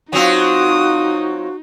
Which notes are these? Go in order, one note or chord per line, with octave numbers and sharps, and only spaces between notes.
F#3 C4 D#4 F4 F#4 D#6